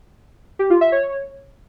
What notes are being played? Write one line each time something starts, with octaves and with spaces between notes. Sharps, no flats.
G4
F4
E5
C#5